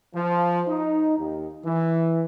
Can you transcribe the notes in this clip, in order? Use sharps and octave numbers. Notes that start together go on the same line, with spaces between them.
F3
D#4
D#2
E3